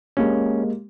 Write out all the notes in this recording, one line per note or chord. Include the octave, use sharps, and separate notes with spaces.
G#3 A#3 C#4 G4